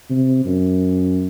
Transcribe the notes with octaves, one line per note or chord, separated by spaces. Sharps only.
C3
F#2